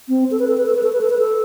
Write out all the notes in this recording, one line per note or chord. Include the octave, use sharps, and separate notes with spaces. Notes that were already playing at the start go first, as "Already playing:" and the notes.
C4
A4
B4
A4
B4
A4
B4
A4
B4
A4
B4
A4